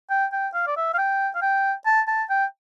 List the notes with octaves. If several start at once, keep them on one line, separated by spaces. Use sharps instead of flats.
G5
G5
F5
D5
E5
F5
G5
F5
G5
A5
A5
G5